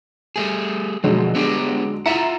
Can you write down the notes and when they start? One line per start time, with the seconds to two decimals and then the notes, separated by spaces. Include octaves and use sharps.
0.36 G3 A3 G#4
1.04 B2 D3 F3 F#3 G#3
1.35 B3 D4 G4
2.06 E4 F4 E5 F#5 A#5